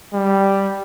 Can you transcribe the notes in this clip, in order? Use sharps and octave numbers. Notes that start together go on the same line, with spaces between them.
G3